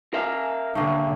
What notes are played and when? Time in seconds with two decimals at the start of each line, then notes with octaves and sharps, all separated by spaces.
0.13 A#4 E5 F5 G#5
0.75 G2 D3 A3 A#3 C#4 D4